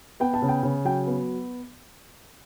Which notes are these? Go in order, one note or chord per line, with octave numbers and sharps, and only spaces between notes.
B3 G5
A5
C#3
G5
C#3
F#3 G5
B3